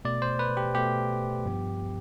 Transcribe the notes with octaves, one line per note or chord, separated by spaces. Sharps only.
B2 A3 D5
C5
B4
G4
B2 A3 G4
G2 F3 B3